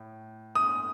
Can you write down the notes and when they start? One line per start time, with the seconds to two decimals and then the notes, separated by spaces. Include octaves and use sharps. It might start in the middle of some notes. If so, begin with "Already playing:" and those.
Already playing: A2
0.55 D#6